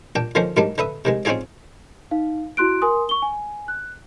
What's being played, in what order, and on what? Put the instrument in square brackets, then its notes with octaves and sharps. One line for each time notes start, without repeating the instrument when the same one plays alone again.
[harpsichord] A#2 D4 G5
D3 D#3 F3 A#3 C#4 C5
G#2 D#3 F#3 G3 A#3 D4
D3 B4 E5 D#6
C3 D#3 G#3
C4 C#4 D#4 F4 G#4 D5
[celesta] D#4 F5
E4 F#4 C6 F#6 D7
A#4 G#5 C6 D#6
C#6 G7
G#5
F#6